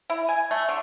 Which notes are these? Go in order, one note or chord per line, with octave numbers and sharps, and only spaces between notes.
E4
G#5
A3
D3